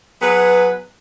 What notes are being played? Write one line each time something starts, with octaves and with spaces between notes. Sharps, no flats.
F#3 B3 G#4 B4